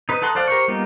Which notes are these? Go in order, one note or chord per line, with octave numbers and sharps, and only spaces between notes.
D#4 B4
D#4 A4 F#5 C6
A4 C5 D5 F5 F#5
G4 A#4 C5 C#6
G3 A#3 B3 D#4 F4